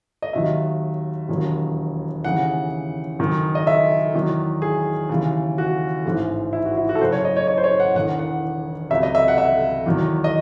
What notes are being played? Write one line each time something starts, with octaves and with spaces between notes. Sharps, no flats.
D#5
D#2 D#3 F#3 E5
E1 D#2 D#3 F#3
D#2 C#3 E3 F#5
F#1 F#2 D#3 F#3
D#5
E5
E2 D#3 F#3
G#4
D#2 C#3 E3
F#4
A1 G#2 E3
E4
F#4
E4
F#4
A4
F#1 F#2 C#3 C5
C#5
D#5
C#5
C#5
C5
C#5
F#5
E1 E2 D#3 F#5
F#5
C#2 C3 F#3 E5
D#5
E5
F#5
E5
E2 D#3 F#3
D#5